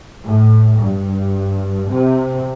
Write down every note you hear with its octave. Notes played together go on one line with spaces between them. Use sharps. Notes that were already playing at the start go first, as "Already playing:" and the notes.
A2
G2
C3